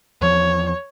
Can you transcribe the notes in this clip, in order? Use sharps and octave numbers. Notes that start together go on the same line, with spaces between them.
E2 F3 C#5